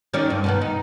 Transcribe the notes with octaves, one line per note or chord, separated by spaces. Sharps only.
D#3 C#4 D5
D2 G2
B2 D#3 B3
D#4